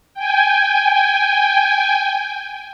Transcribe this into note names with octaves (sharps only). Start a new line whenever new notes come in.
G5 G#5